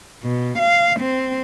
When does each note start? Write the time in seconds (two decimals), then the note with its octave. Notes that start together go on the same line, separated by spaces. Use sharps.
0.24 B2
0.59 F5
1.00 C4